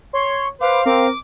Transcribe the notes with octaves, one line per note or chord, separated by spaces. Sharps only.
C#5 C6
B4 C5 F5 D6
C4 A#4 D6